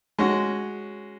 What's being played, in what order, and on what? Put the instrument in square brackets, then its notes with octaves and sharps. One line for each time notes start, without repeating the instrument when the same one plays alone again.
[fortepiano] G#3 C#4 F#4